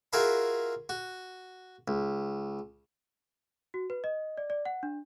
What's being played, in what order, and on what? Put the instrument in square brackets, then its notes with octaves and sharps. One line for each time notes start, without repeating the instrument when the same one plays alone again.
[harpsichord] F4 F#4 G#4 A#4 E5 B5
F#4
C#2
[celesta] F#4
B4
D#5
D5
D5
F#5
D4